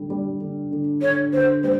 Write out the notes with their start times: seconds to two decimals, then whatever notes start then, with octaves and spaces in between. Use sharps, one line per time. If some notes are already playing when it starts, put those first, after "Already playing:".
Already playing: D3 G3
0.10 G3
0.40 D3
0.71 D3
1.01 D3 C#5
1.32 D3 C5
1.63 G3 C5